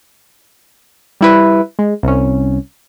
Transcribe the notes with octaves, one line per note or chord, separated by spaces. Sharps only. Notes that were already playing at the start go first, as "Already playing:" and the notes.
G3 E4 B4
G#3
C2 C#4